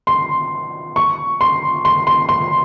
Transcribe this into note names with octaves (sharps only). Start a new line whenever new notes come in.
C6
C#6
C6
C6
C6
C6